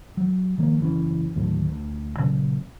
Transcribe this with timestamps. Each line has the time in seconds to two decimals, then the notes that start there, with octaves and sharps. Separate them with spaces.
0.17 F#3
0.58 D#3 F3 A#3
0.80 F#1 E3 C#4
1.35 D#2 A2 D3 F#3
1.65 D2
2.19 A#2 C#3 F#3 C#4